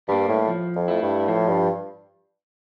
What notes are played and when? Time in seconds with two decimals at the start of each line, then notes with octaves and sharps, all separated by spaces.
0.08 G2 G3 A#3
0.28 A2
0.48 F3
0.75 F2
0.88 A3 E4
1.02 G2
1.28 A2 F3
1.48 G2